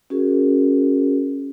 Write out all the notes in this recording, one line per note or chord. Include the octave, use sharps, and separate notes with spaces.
C#4 F#4 G#4 A#4